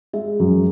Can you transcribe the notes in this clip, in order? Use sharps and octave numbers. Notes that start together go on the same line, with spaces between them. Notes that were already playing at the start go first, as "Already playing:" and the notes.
G#3 E5
F#2